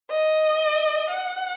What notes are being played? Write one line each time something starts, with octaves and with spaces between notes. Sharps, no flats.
D#5
F#5